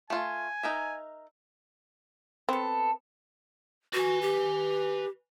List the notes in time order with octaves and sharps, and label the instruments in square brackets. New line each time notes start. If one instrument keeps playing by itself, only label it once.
[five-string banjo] A3 F4 [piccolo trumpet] G#5
[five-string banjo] D#4 A#4 E5
[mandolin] B3 A4 [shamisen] C4
[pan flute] F#4 [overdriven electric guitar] B4 G#5
[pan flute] G4